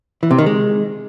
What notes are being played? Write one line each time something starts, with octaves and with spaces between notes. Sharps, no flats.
E3
C3
D#3
G#3